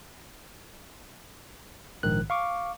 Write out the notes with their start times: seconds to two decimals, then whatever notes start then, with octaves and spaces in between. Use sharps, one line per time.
2.03 A#1 G#2 D#3 F#6
2.30 F5 C#6 D6